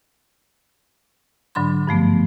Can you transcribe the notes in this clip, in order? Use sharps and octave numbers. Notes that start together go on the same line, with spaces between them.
G#2 D3 F#3 D4 B5 C6
G2 F3 A3 B3